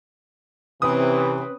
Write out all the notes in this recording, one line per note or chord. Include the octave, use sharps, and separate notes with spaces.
C3 E3 C4 C#4 B4 D#6